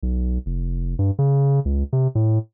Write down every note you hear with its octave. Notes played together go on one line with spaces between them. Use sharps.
B1
F1
G2
C#3
C#2
C3
A2